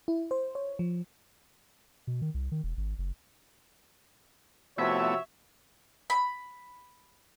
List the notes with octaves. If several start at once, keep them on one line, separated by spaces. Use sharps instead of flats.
E4
C5
C#5
F3
B2
D#3
C2
D#3
E1
G#1
F#1
C3 F3 A3 B3 E4 F#4 C#5 E5
B5